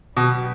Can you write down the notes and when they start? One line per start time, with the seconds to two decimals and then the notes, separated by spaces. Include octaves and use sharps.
0.16 B2 F#3 B3 D4 G4 B4